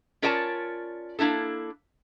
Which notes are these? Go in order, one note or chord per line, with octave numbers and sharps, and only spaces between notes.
C#4 F4 A#4 C#5 D5 A5
A#3 D4 E4 A4